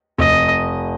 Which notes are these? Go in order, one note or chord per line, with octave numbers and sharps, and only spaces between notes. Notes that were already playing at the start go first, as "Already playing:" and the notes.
F1 D#5